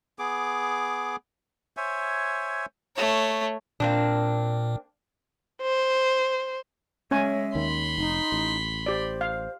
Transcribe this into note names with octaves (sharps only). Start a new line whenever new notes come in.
B3 G#4 D6
C5 C#5 E5 G#5
A3 C#5
A#2 A#3 C4 D4
C5
G#3 C#4 C#5 E5 G#5
D#2 D#3 B5 C6
F1 D#4
A1
G4 C5 D5
F5